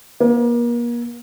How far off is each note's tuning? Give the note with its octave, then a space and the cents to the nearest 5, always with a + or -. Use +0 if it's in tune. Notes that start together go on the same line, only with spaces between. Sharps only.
A#3 +35